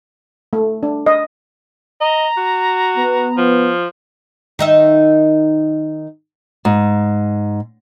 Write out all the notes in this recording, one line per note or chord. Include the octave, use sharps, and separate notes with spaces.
A3
D4
D#5
D#5 A#5
F#4
B3
F3
D#3 D#4 E5
G#2